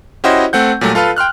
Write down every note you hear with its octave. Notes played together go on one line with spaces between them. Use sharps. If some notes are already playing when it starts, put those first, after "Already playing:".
C#4 E4 F#4 G4 C5 D#5
A3 C4 F#5 G6
A#2 F#3 G3 A3
F4 A4 B4 F5
G5 C6 F6 F#6